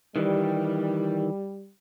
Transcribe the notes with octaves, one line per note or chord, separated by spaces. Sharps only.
D#3 E3 G3